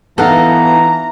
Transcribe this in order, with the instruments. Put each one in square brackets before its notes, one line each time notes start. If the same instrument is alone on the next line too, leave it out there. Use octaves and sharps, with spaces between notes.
[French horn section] E3 [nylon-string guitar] B3 D#4 [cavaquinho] A4 F5 F#5 [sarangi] A#5